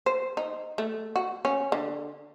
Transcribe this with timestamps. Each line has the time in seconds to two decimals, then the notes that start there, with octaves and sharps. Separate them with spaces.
0.06 C5
0.37 D#4
0.78 A3
1.16 F#4
1.45 C#4
1.72 D3